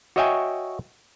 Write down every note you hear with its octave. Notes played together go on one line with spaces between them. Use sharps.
F#4 C#5 D#5 E5 G5 G#5